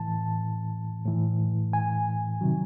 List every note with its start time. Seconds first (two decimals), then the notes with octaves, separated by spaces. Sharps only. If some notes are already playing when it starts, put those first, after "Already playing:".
Already playing: A2 E3 A5
1.05 A2 E3
1.73 G#5
2.41 C3 D#3 F#3